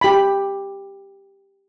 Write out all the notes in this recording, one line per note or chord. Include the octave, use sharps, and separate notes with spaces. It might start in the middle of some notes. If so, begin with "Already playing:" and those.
G4 B5